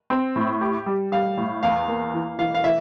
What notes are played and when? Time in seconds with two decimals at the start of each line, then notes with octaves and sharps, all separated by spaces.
0.10 C4
0.36 A2
0.61 G4
0.86 G3
1.12 G3 F5
1.37 A2
1.63 E2 F5
1.88 A#3
2.14 E3
2.39 E3 F5
2.54 F5
2.64 E3 E5